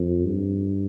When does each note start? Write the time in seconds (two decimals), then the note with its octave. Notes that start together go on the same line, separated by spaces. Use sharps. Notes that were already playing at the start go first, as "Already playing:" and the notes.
Already playing: F2
0.26 G2